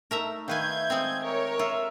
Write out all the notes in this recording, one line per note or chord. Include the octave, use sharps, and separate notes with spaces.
A3 D#4 A#4 E5 A#5
D#3 B4 E5 F5 G#5 G6 G#6
G#3 C4
A#4 C#5
F4 E5